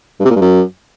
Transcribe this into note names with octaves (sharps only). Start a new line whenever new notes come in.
G2
C3
A#2
G2
F#2